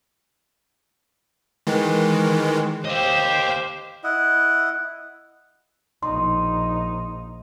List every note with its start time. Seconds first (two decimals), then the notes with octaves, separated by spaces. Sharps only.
1.67 D#3 E3 G#3
2.85 G4 C5 D#5 F5
4.04 E4 D#5 F#5
6.03 A#1 D#4 C6